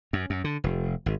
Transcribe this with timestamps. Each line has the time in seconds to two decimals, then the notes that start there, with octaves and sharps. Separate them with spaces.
0.13 F#2
0.30 F#2
0.44 D3
0.64 F1
1.06 G#1